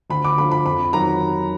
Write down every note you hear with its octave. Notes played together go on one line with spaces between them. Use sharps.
D2 B5
D6
D3 F3 B5
B5
F2 B5
D#3 F#3 A#5